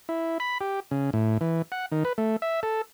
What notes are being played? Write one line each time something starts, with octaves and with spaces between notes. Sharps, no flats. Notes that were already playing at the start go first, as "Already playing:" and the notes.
E4
B5
G4
C#3
A2
E3
F#5
D#3
B4
A3
E5
A4